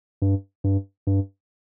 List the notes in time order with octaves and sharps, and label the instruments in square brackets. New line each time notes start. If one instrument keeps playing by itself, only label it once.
[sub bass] G2
G2
G2